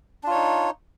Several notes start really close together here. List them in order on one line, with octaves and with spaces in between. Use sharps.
D4 F4 C#5 D#4